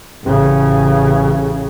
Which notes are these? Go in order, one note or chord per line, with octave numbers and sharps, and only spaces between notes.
A1 C#3